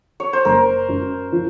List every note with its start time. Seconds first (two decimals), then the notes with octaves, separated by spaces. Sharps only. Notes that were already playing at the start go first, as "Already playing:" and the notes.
0.20 C#5
0.33 C5
0.45 F#1 A#4
0.89 F#2
1.32 F3